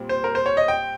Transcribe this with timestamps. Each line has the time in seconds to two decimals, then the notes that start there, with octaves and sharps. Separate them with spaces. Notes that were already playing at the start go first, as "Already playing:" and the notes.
Already playing: A#2 G3 C4
0.09 C5
0.24 A#4
0.35 C5
0.46 C#5
0.57 D#5
0.68 G5